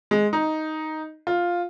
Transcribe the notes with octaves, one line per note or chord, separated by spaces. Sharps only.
G#3
D#4
F4